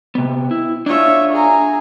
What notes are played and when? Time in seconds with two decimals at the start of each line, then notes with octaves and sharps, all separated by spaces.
0.15 C3 B3
0.51 E4
0.86 D4 F4 C#5 E5
1.32 G#4 A#5